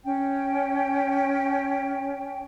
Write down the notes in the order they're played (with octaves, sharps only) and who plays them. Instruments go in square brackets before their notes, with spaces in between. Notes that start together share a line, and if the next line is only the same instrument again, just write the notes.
[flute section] C#4 G5